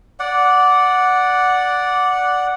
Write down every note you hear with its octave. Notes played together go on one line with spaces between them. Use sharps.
D5 F#5